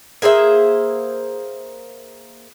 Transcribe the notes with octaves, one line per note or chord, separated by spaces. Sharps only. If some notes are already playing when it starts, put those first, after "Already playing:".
A#3 G#4 C5 E5